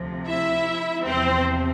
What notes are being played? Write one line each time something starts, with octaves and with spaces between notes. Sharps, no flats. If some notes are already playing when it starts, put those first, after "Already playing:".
Already playing: D2 C3 F3
E4 E5
E2 C3 F3 C4 C5